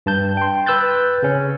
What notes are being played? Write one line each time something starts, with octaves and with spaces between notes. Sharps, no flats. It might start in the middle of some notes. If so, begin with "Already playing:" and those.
G2 A5 G6
G5 C6
B4 E6 F#6 G6 A6
C#3 C#4